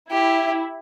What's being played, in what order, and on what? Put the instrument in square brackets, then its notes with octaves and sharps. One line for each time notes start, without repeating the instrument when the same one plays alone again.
[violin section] E4 [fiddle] G4